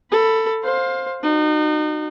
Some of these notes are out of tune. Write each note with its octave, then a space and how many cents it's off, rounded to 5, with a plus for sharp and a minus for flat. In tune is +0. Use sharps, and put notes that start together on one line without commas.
A4 +15 B5 +0
C5 +10 F5 +20
D#4 -35 F#4 +0